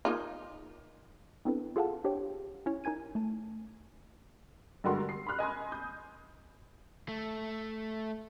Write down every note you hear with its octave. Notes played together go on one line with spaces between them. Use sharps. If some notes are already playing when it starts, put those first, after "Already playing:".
A#3 D#4 F4
B3 C4 D4 E4 A4 B4
F4 G#4 A4 F5 F#5 A5
D4 G4 C5 C#5 G5
C#4 E4 C#5
D#4 A#4 G#5 G#6 D#7
A3 A5
G2 D3 G#3 F#4 A#4 C6
C7
B5 C6 F6 F#6
D#5 G#5 B5 C6
D#6 G6
A3